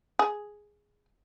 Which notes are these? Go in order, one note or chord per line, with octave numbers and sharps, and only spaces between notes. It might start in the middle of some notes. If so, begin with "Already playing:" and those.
G#4